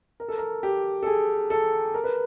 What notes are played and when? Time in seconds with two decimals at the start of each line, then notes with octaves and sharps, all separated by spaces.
0.20 A#4
0.28 A4
0.38 A#4
0.63 G4
1.03 A4
1.07 G#4
1.50 A4
1.94 A#4
2.04 B4